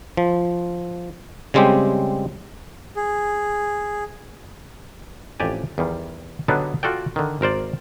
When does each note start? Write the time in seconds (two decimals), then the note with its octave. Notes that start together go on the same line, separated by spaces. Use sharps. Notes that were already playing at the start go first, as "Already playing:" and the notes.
0.17 F3
1.54 C#3 G3 G#3 C4 G4
2.96 G#4
5.40 A1 F2 G4 D5 G#5
5.78 E2 D#3 G3
6.48 D3 F#3 G3 B3 D4 D#4
6.83 F4 F#4 A4 D5 G5
7.16 D3 D#3
7.41 G#1 A#4 C5 D5